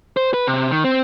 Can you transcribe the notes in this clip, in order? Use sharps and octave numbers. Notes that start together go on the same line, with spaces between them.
C5
B4
C3
D#3
C4